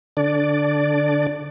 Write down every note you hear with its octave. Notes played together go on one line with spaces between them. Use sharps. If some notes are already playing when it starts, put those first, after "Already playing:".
D3 D4 D5